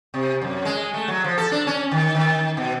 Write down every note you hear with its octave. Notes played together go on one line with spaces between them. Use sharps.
C3
F#2
G#3
A3
F#3
F3
A4
D4
C#4
D#3
D#3
B2